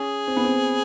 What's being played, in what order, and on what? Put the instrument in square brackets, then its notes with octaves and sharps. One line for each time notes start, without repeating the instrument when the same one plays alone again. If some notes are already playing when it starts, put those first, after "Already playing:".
Already playing: [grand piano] C#4 [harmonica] G#4
[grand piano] C4
B3
C4